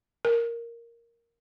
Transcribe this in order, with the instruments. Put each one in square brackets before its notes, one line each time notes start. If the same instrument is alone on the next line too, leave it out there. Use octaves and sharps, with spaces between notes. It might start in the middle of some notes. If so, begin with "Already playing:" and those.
[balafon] A#4